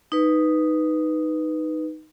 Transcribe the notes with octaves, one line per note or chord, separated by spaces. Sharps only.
D#4 B4